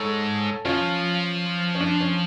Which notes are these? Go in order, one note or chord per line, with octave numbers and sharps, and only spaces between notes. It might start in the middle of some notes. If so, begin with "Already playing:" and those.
Already playing: G#2 A4 C#5
F3 C#4 F4
C#4
D4
C#4